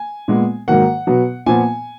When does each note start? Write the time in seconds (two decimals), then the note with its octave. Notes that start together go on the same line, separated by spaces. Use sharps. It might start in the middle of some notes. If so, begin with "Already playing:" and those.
Already playing: G#5
0.28 A#2 G#3 B3
0.68 G#2 D#3 F#3 A#3 F#5
1.07 B2 F#3 B3
1.46 A#2 F3 B3 G#5